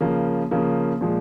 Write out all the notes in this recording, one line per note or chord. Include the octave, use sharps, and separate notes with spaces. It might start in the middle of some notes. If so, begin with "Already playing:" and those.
C#3 F3 A#3
C#3 F3 A#3
A#2 F3 G#3